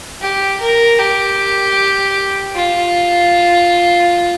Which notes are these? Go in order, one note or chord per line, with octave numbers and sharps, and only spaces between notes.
G4
A#4
G4
F4